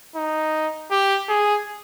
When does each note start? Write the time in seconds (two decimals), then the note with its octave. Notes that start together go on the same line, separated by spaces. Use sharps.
0.16 D#4
0.91 G4
1.29 G#4